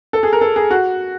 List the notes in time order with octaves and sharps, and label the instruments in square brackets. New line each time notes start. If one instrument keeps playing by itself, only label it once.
[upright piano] A4
G#4
A#4
A4
G#4
F#4